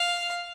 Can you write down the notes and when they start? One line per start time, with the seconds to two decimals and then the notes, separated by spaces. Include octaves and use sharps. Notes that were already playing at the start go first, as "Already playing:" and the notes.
Already playing: F5